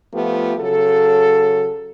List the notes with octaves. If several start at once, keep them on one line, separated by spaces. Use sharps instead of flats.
F3 A3 B3 F4 G4
C#3 F#3 A4